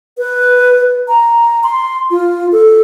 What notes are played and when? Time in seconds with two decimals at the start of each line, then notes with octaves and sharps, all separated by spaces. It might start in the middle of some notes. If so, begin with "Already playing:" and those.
0.18 B4
1.08 A#5
1.64 C6
2.11 F4
2.52 A4